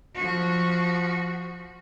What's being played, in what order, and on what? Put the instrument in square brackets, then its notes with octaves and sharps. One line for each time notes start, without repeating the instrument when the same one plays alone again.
[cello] F3 F#4